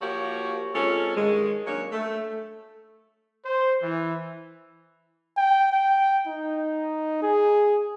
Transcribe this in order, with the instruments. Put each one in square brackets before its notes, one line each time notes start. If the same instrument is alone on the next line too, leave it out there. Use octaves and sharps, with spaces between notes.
[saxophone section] F3 A#3 F#4 G4 C#5
G#3 C4 C#4 F4 A4
G2 D#3 G#3
F#3 A#3 C#4 D4 C#5
A3
[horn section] C5
E3
[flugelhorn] G5
G5
D#4
G#4